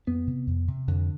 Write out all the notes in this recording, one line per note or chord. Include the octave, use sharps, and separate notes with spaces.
F2 B3
C3
F2
C3
F2 D3